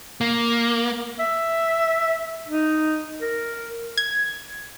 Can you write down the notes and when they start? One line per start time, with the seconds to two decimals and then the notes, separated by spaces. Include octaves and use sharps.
0.21 A#3
1.19 E5
2.48 D#4
3.21 A#4
3.98 G#6